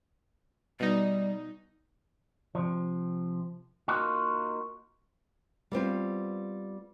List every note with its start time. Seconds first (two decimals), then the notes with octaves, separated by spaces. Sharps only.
0.80 B2 G3 D#4
2.55 C3 F3
3.88 A#3 D#4 F4 F#4
5.72 G3 B3 C4 F4